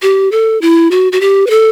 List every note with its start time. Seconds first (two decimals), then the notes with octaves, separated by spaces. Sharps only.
0.02 G4
0.32 A4
0.62 E4
0.91 F#4
1.12 F#4
1.21 G4
1.47 B4
1.50 A4